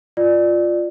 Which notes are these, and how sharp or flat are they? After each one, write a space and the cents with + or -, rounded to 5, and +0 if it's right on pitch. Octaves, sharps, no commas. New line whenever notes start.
F4 +0 D5 +15